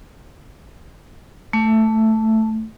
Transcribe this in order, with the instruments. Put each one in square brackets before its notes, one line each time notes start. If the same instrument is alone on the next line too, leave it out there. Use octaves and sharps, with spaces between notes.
[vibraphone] A3